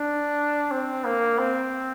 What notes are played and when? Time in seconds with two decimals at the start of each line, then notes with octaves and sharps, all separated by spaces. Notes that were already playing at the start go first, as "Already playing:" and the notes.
Already playing: D4
0.71 C4
1.04 A#3
1.38 C4